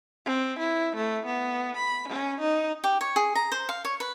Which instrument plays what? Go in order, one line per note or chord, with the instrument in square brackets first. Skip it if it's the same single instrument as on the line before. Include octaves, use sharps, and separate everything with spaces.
[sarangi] C4
E4
A3
B3
B5
C#4
D#4
[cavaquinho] G4
C#5
G#4
A#5
C5
F5
C#5
B4